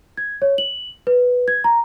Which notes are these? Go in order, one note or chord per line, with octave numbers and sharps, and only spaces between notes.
G#6
C#5
F#7
B4
G#6
A#5